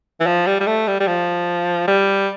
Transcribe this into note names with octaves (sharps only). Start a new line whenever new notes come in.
E3
F3
G3
G3
A3
G3
G3
F3
G3